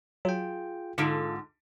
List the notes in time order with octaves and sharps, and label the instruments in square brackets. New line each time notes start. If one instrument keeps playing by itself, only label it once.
[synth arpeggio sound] F#3 [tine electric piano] F4 G#4 G5
[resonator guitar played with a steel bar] G#2 D3 [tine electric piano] F4 A4 [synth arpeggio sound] C#7 D7